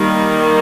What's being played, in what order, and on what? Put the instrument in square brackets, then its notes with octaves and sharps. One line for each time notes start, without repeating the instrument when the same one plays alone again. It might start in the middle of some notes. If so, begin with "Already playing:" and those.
Already playing: [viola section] D#3 G3 A#3